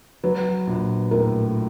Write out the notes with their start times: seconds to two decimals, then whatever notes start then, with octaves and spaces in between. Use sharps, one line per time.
0.24 F#3 B4
0.67 A#1
1.11 A2 A#4